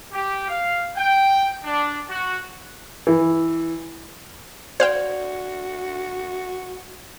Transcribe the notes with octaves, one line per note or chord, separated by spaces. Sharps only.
G4
F5
G5
D4
F#4
E3
F#4 C5 D5 F5 G5